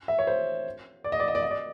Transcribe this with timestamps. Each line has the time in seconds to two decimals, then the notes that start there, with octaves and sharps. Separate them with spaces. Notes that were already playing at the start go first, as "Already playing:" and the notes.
0.08 E5
0.19 C#5
0.27 C5
1.04 D5
1.12 D#5
1.20 D5
1.28 D#5
1.35 D5
1.42 D#5
1.51 D5